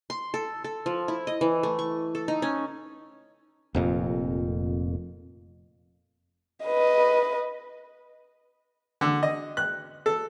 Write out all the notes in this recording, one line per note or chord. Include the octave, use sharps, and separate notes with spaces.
C6
A4
A4
F3
E4
D#5
E3
A3
C#6
A4
D#4
C#4
F1 F2 A#2
B4 D#5
D3
D#5
F#6
A4